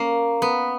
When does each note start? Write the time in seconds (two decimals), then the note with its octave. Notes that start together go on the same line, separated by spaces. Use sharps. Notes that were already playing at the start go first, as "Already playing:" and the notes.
Already playing: A#3 C#4
0.42 B3